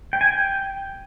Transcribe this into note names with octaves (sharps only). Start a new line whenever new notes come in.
G5
G#5
G5